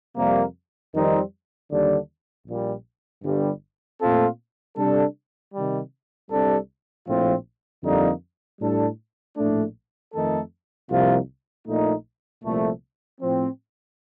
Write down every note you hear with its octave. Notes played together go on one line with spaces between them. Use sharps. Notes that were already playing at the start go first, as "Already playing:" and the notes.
F2 C3 G3 A#3
F2 D#3 G3 C4 D#4
D#2 D3 G3 D4
A#1 A#2 G3
G1 G2 D3 G3
A#2 A3 C4 F4 A4
C3 G3 D4 A4
C3 D#3 G3
C2 C3 G3 D4 A4
A#1 A2 F3 C4 F4
F2 D3 G3 A#3 D#4
A2 G3 D4 A4
A#1 A2 A3 D4
F2 D#3 A3 D#4 A4
C2 C3 F3 A#3 F4
A#1 A#2 A3 D#4
C2 A#2 F3 A3
A2 F3 C4